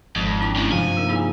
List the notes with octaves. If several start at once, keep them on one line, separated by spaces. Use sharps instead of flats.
G#1 F2 G#3
D4 E4 D6
F#2 A2
G2 C3 F3 G#5
A#3 D#4 A#4
D#4 E4 G#4